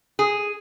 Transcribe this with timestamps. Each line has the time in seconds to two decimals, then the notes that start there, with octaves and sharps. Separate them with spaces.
0.19 G#4